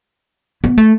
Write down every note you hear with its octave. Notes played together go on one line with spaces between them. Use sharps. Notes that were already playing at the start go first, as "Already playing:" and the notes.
B3
A3